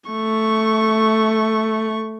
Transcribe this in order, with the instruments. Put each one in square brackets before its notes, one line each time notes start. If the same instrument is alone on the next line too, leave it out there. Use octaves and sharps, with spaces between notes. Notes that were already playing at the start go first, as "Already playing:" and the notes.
[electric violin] A3 C#6